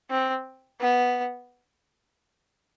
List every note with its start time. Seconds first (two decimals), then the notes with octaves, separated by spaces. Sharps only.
0.11 C4
0.81 B3